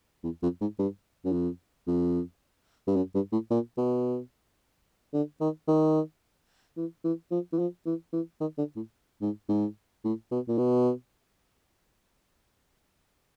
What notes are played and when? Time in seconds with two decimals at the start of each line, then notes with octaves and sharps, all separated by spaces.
0.24 E2
0.42 F2
0.61 G#2
0.79 G2
1.25 F#2
1.33 F2
1.88 F2
2.88 G2
2.96 F#2
3.15 G2
3.32 A2
3.51 A#2
3.78 B2
5.14 D3
5.41 D#3
5.68 D#3
6.77 E3
7.04 E3
7.31 F3
7.53 E3
7.59 F3
7.86 E3
8.13 E3
8.41 D#3
8.58 D3
8.76 A2
9.22 G#2
9.49 G#2
10.04 A2
10.31 B2
10.48 A#2
10.58 B2